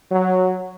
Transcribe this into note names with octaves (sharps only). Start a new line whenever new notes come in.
F#3